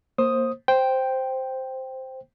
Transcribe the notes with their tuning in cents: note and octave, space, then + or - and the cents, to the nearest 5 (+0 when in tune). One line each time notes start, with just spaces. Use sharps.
A#3 +0 C5 +20 D#6 +0
C5 +0 G5 +0